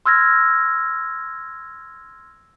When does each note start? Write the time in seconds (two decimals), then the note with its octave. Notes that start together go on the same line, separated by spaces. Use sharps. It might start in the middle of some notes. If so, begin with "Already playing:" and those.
0.06 C6 E6 F6 G#6 A#6